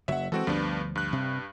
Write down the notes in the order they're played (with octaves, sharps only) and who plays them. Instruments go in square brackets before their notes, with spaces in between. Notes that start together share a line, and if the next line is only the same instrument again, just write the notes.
[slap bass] F#1 F#3 [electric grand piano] E5 F#5
[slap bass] E3 G#3 [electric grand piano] C4 F#4 A4
[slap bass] D2 F3 G3 [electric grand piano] G2 B3 D4
[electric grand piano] G2 F#6
[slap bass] C3